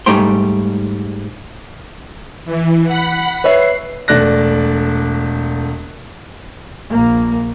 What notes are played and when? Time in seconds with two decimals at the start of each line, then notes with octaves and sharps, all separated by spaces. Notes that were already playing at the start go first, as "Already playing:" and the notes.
0.06 G#2 G3 A3 D#4 G5 C6
2.45 E3
2.85 F#5 B5
3.44 B4 C#5 E5 C7
4.08 E1 A3 D5 F#6 A#6
6.88 A#1 A#3